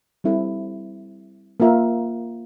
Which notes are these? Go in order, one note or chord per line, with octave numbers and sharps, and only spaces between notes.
G3 C4 E4 A4
A#3 F4 A#4 E5